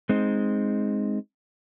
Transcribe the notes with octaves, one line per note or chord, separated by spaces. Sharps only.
G#3 C4 D#4